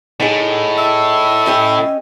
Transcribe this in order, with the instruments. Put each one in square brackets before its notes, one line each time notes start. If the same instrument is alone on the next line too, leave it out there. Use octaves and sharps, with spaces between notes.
[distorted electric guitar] A2 [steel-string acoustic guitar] D#4 G#4
[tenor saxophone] E5
[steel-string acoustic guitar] C#4 G4 D#5